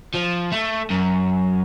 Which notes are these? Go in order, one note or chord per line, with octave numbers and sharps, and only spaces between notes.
F3
A3
F#2